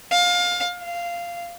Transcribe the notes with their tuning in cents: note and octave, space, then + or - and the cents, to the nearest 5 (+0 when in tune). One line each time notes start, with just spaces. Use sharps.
F5 +25
F5 -10